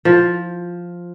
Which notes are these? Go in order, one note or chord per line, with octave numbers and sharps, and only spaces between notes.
F3